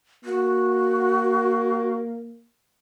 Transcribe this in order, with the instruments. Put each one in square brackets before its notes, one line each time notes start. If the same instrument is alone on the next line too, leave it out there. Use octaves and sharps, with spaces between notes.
[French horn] A#3 [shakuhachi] F#4